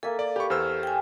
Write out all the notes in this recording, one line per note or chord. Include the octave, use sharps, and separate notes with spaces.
A#3 A4 E5 G#5
D5
G4 B4 C#6
E2 G4 C5 E6 F6
G5 G#5